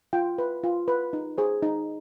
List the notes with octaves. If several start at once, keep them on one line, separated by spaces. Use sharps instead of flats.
F4 G5
B4
F4
B4
D#4
G#4 C5
D#4